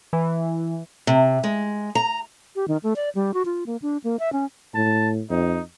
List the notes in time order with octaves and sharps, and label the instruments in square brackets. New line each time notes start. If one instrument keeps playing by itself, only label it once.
[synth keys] E3
[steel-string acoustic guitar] C3
G#3
A#5
[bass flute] G4
D#3
A3
D5
G3
F#4
F4
A#3
D4
A#3
E5
C#4
[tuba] A2 [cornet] A5
[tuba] F2 [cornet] D#4